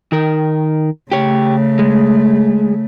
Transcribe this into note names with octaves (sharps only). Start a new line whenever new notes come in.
D#3 A#4
C#3 A3 G4 C#5
G#3